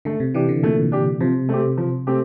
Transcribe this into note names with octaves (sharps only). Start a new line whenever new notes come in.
D3 A3
C3
E3 D4 G4
D3
A#2 A3
D4 G4
C3 F3
A3 C4 G4
F3
A3 C4 G4